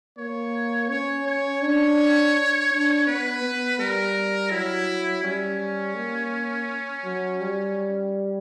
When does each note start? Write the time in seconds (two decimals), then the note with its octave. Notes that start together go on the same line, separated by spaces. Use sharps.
0.18 A#3 C#5
0.90 C#4 C#5
1.27 C#5
1.62 D4 C#5
2.71 D4
3.07 B3 B4
3.42 B3
3.79 G3 A#4
4.51 F#3 E4
5.23 G3 C#4
5.96 A#3
7.04 F#3
7.41 G3